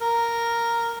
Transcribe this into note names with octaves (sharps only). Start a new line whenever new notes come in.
A#4